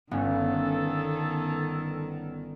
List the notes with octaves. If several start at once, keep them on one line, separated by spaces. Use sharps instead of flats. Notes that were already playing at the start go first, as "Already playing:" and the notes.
G1 D#3 B3 C#4 A4